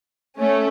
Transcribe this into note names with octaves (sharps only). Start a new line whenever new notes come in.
A3 C#4